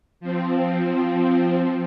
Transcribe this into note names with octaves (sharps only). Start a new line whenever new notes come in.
F3 C4